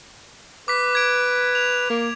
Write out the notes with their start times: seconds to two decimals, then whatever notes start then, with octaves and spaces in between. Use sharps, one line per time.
0.68 B4 D6 B6
0.95 G#6 D7
1.55 F7
1.90 A#3